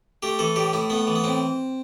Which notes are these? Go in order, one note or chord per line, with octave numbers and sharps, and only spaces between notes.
A3 G4
E3 A4
A2 G4
A2 E4
A3 B3
E3
B3
A2 C4